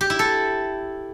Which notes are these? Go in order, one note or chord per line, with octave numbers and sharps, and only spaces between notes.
G4
E4
A4